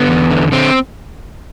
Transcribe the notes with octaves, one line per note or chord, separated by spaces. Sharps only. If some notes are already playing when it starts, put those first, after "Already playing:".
Already playing: D3 B3
E2
D3
D3 C4